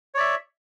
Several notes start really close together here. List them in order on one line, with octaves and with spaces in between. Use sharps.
C#5 D5 E5